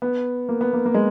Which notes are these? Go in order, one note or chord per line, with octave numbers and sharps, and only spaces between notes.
B3
A#3
B3
A#3
A#3
G#3